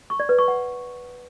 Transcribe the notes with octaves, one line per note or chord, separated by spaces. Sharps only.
C#6
D5
B4
C#6
F#5